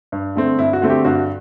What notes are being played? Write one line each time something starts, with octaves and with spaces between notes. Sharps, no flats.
G2
D3 A3 C4
G2 E4
F#4
D3 A3 C4
G4
G2 F#4